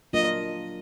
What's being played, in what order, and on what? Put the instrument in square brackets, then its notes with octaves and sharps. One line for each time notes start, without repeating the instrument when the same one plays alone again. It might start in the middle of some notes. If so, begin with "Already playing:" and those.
[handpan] F#3 A#3 D4 F4 A#4 [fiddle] D#5